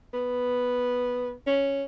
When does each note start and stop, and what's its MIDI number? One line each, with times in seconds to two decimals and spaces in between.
0.14 1.31 59
1.46 1.83 61